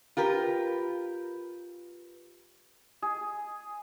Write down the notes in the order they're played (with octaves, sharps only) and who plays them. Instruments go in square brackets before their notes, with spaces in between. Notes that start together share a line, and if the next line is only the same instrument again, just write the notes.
[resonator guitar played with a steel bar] F4 G4 A#4 B4
[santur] G#4